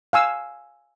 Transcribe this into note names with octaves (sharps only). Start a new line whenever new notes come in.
F5 G#5 E6